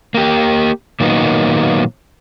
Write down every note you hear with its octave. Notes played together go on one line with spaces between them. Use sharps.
A#3 G4
A#2 D#3 F#3 A#3 B3 D#4